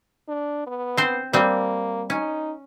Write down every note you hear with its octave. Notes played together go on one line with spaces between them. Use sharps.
D4
B3
C4 C5
G3 A#3 C4
C#4 D#4